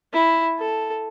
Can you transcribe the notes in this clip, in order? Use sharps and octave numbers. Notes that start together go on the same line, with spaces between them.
E4
A4